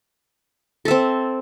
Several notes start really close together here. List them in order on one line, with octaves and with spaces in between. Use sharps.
A4 E5 C4